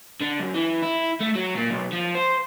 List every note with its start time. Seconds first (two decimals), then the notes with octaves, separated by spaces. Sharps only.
0.21 D3
0.39 F#2
0.54 E3
0.82 E4
1.20 A3
1.35 F#3
1.55 A#2
1.70 B1
1.92 F3
2.15 C5